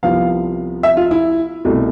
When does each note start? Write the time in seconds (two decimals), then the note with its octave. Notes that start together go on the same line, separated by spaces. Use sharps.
0.03 C2 C3 F3 B3 F5
0.83 E5
0.97 F4
1.11 E4
1.65 C2 B2 A3